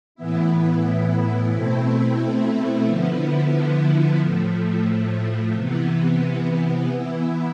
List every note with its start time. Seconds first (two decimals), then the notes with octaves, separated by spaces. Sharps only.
0.15 A2 E3 B3 E4
1.50 B2 A3 C4 E4
2.84 D3 F3 B3 E4
4.19 A2 F3 A3
5.53 C3 E3 B3
6.88 E3 B3 E4